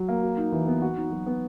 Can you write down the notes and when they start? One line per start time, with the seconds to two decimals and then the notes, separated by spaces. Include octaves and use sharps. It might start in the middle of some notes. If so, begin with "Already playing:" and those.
Already playing: F#3
0.09 A#3
0.23 F#4
0.38 D#4
0.52 E3
0.67 B3
0.82 F#4
0.97 D#4
1.12 F#3
1.26 B3